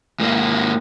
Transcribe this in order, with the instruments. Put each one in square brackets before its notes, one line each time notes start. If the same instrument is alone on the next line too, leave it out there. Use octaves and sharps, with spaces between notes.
[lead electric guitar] G#2 A#3